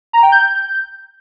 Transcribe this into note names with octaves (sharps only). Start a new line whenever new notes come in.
A#5
G5
G6